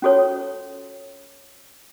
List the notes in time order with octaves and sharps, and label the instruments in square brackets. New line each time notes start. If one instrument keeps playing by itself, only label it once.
[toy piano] C#4 F4 F#4 A4 C#5 A5